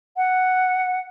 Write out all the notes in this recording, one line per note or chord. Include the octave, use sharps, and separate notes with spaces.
F#5